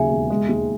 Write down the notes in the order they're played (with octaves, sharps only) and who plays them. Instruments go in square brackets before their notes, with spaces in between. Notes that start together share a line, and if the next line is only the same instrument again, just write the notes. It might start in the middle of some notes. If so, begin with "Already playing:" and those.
Already playing: [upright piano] D#2 C#3 F#3 [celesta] E5 G#5
[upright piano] E1
G#3
D#2